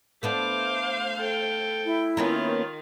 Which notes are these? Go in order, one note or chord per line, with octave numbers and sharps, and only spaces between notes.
A3 B3 D4 C5 F5 D6
A4 G5
E4
D#3 A#3 B3 C#4 F4